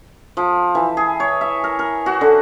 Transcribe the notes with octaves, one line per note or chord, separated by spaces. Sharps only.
F3
E3
G#4
C#5
E5
A#4
A#4
F#4
D3